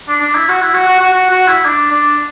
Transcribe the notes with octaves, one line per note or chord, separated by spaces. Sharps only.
D4
D4
E4
F#4
E4
F#4
F#4
F#4
F#4
F#4
E4
D4
D4